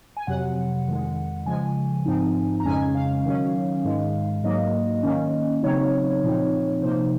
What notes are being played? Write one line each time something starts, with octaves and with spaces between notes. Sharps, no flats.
G#5
F2 C3 F#3 F#5
F2 D#3 G#3
C#3 F3 G#3 G#5
G#2 F3 C4 D#4
A#5
F2 C#3 G#3 C#4 G#5
F5
D#3 F#3 C#4
G#2 D#3 G#3
G#2 F#3 A#3 D#5
D#3 A#3 C#4
C#3 F#3 C4 D#4 C#5
A#2 F3 C4 D#4
C3 F3 A#3 D#4 C5